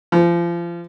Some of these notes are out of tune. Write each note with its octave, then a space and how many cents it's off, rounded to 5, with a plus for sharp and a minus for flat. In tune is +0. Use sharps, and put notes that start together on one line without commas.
F3 -30